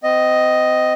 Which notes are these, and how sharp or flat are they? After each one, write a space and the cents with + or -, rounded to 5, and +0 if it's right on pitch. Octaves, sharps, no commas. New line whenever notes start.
C4 -25 D#5 +0